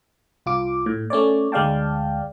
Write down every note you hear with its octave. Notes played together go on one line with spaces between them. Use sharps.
C2 F4 D6
A2
A3 C#4 C#5 D5
D2 G#3 D5 F5 G5 A5